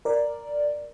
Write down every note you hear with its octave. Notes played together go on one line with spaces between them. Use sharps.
A#4 D5